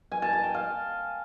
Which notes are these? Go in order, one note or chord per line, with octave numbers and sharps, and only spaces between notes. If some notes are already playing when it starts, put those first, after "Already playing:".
G#5
A5
A5
G5
F5